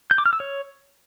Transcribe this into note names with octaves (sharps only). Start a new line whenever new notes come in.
G6
D6
F6
E6
C#5